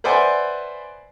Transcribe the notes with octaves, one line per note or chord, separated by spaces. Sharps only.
B4 C5 D5 E5 F#5 G#5